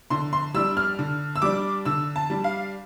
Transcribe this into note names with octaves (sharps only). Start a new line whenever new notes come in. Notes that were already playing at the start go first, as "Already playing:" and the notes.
D3 C6
C6
G3 D4 E6
F6
D3
E6
G3 D4 D6
D3 E6
A5
G3 D4
F5